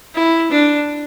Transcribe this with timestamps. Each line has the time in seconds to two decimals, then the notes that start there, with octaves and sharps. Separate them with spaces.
0.15 E4
0.51 D4